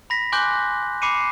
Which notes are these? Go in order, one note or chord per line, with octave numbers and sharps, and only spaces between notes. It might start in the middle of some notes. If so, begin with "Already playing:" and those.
B5 A#6 B6
G#5 C6 D6 F#6 G6
B5 D6 C7 C#7 D#7 E7